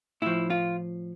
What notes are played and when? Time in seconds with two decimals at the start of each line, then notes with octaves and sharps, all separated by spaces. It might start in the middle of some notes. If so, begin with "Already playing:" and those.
0.22 A2 F3 E4
0.50 F4